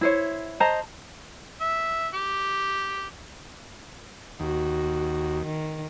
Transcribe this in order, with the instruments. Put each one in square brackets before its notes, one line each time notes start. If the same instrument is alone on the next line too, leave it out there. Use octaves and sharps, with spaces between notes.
[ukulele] E4 C5 C#5
C5 D#5 A5 A#5
[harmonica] E5
G4
[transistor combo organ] D#2 [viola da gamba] F#4
[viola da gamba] D#3